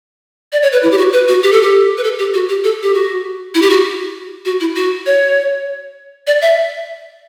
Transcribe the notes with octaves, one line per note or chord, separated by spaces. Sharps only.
D5
C#5
B4
E4
G4
F#4
B4
F#4
G4
A4
G4
B4
A4
G4
F#4
G4
A4
G4
F#4
E4
G4
F#4
F#4
E4
F#4
C#5
D5
E5